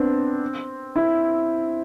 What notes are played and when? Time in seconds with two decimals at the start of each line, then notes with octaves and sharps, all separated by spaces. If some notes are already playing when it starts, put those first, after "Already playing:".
Already playing: B3 C4 D4
0.96 E4